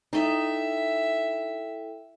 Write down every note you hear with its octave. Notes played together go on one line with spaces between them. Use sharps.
D#4 E4 A4 D#5 E5 G5